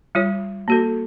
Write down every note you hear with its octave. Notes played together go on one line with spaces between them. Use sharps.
G3 F4 C#5
A#3 F#4 A4